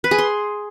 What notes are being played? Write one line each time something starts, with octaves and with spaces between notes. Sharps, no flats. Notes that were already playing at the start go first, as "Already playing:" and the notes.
B4
G#4
C6